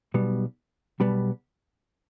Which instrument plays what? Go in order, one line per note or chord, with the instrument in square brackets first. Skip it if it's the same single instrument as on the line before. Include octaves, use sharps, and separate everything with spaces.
[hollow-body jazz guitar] B1 B2 G3 B3
B1 B2 G3 B3